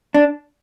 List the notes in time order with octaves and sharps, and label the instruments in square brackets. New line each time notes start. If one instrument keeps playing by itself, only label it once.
[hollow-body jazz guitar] D4